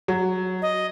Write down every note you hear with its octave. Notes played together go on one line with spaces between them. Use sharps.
F#3
D#5